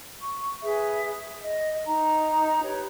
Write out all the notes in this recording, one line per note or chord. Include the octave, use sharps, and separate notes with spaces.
C#6
G#4 B4 E5
D#5
D#4 A#5
G4 B4 C#5